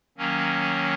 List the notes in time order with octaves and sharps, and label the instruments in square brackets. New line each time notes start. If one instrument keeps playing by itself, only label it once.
[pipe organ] D#3 F#3 A#3 C#4